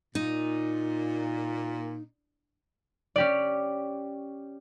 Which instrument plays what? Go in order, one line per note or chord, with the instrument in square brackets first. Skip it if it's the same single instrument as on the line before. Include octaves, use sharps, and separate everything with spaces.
[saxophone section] A#2 [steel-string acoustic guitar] D#4
[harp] C#4 G4 D5